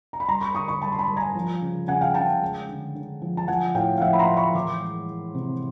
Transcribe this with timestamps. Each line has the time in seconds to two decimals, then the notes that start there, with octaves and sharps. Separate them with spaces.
0.13 A#5
0.20 B5
0.28 G3 A#5 C6
0.41 B5 C#6
0.55 D3 C#6 D#6
0.68 B5 C#6
0.82 G3 A5 B5
0.92 C6
0.99 A5 B5
1.08 G3
1.17 G#5 A#5
1.35 F3
1.62 C#3
1.88 C#3 F#5 G#5
2.01 F5 G5
2.14 C#3 G5 A5
2.41 G#3
2.69 D3
2.95 D3
3.22 F3
3.37 A5
3.48 F3 F#5 G#5
3.75 A2 F5 G5
3.98 F5
4.01 F3 E5 F#5
4.13 B5
4.19 A#5 C6
4.29 A2
4.37 B5 C#6
4.54 E3 C6 D6
4.82 G#3
5.08 G#3
5.35 C3